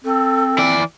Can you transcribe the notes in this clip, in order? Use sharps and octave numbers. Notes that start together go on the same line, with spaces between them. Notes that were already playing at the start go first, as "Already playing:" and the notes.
C4 A4
E3 D5